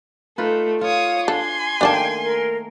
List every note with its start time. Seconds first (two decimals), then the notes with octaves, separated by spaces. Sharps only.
0.38 A3 D#4 F4 B4
0.81 F4 C#5 F5 D#6
1.28 D4 A4 G#5 C6
1.81 D#3 A3 A#3 D4 D5 G5 A5
2.21 A#4